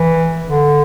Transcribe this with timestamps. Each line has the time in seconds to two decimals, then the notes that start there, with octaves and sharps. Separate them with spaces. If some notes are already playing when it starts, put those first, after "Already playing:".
Already playing: E3
0.48 D3